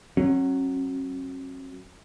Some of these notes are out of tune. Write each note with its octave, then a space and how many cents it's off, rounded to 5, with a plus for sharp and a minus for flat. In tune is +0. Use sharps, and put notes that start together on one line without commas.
F#3 +0 C#4 -45